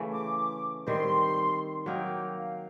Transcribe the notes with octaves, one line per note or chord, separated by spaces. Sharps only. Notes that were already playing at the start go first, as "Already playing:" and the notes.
Already playing: C#3 E3 A3
D6
D#3 G3 C4 C6
F#3 A#3 D#4 G5
F5